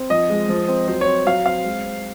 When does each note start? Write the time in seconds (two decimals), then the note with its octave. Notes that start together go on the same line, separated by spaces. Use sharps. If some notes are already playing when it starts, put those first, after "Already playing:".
Already playing: C4
0.10 F3 D#5
0.30 G#3
0.49 F3
0.68 C4
0.88 F#3 C5
1.01 C#5
1.07 C4
1.26 F#3 F5
1.45 C4 F5
1.65 G#3
1.85 C4